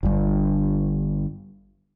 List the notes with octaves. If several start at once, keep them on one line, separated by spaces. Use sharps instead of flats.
G1 G2